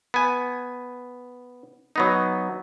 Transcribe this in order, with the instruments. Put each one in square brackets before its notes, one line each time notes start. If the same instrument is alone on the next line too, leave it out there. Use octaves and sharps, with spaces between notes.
[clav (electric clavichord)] B3 G#5
F#3 B3 D#4